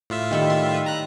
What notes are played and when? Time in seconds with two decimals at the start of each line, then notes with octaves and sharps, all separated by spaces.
0.10 A2 F4 E5
0.31 D#3 G3 A4
0.50 C6
0.74 B4
0.86 A#5 F#6